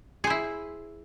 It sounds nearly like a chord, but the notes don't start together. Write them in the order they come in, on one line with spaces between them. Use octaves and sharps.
G#4 C5 E4